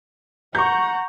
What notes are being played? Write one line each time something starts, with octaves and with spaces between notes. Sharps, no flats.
F#5 A#5 C#6 G6